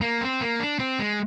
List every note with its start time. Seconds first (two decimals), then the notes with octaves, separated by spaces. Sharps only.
0.01 A#3
0.21 C4
0.41 A#3
0.60 D4
0.79 C4
0.99 G#3